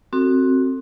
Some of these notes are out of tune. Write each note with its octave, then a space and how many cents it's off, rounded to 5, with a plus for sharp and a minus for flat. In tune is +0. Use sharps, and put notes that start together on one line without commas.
C4 +15 F#4 +0 A4 +30